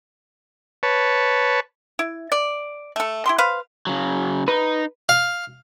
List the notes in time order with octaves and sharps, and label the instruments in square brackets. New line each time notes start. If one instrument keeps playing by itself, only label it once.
[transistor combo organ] B4 C#5 A5
[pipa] E4
D5
A3 A4
E4 G4 C6
B4 C5 F5
[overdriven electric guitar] C#3 F#3
[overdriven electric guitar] D#4 [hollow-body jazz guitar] B4
[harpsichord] F5